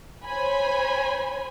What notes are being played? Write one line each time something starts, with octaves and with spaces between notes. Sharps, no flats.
C5 C#5 G#5 B5